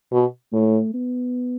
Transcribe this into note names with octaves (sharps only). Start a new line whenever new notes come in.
B2
A2 A3
B3